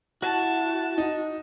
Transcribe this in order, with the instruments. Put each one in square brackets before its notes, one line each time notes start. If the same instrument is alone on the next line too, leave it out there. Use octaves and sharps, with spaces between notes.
[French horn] E4 [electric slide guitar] F#4 [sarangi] A5
[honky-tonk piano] D#4